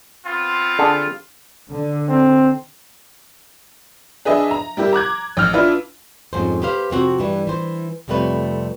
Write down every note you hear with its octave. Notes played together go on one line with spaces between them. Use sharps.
B3 C4 F4
D3 G#4
D3
C4
D4 G#4 B4 D#5 E5
A#5
G3 E4 G4 A#4
A#5 D6 F#6 G#6
A1 F6
D4 E4 F4 B4
F2 G#2 G#3 C#4 C5
G4 B4 C5 F5
F2 C3 C4 F#4
G2 E3 G3
E3 C5
F2 C3 G3 A3 B4 C#5